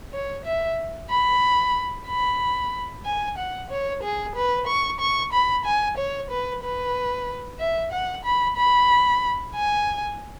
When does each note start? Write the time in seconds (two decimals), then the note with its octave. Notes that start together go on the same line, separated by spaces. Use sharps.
0.13 C#5
0.45 E5
1.10 B5
2.08 B5
3.05 G#5
3.37 F#5
3.70 C#5
4.03 G#4
4.36 B4
4.67 C#6
5.00 C#6
5.33 B5
5.65 G#5
5.97 C#5
6.30 B4
6.63 B4
7.59 E5
7.92 F#5
8.25 B5
8.57 B5
9.55 G#5